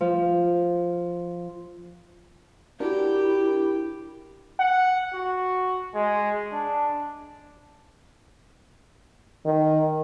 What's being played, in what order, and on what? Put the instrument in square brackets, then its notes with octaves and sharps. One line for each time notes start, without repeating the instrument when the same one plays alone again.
[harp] F3
[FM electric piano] D4 F#4 A#4 [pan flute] E4 [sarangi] G4
[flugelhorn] F#5
F#4
G#3
D4
[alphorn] D#3